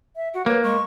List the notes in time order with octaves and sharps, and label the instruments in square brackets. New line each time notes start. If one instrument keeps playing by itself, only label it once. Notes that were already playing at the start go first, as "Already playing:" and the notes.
[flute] E5
[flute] F#4 [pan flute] F#5
[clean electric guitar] A#3 [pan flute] B4 [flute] C#5
[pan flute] G#3 [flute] C#6